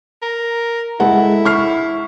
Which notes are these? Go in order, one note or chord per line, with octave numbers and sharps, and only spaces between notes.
A#4
G#3 E4 A4 F#5
C#6 F6 C7